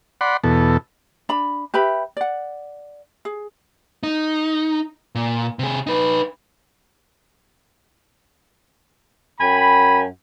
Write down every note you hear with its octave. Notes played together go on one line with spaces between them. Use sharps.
D5 F#5 B5 C6
E2 B2 A4
D4 B5
G4 B4 E5 B5
D5 F#5
G#4
D#4
A#2
C3 G#4
D#4 B4
F#2 G5 G#5 B5